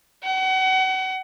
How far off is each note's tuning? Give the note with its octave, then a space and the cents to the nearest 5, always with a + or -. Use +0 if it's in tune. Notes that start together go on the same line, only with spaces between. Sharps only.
F#5 +35